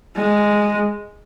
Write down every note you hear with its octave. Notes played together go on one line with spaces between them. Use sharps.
G#3